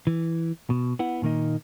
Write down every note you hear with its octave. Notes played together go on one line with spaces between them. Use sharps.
E3
B2
B3 E4 F#5
A#2 D#3 A#3 D#4